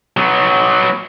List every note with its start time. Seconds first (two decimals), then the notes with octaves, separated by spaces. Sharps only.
0.17 F#3 B3